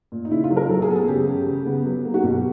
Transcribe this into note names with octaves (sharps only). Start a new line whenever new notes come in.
A#2
D#4
C#3 E4
F4
F#3
A#4
F#3 A4
G#4
B3 A4
G#4
C#3 G4
C#3
C#3
B3
F#3
A#3
F#4
B2 G4